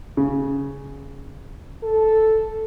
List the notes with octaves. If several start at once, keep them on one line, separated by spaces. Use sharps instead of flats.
C#3
A4